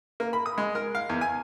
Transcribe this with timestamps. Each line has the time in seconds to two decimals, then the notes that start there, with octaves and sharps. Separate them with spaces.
0.20 A#3
0.33 B5
0.46 D#6
0.58 G#3
0.75 A#4
0.95 F5
1.10 E2
1.21 G#5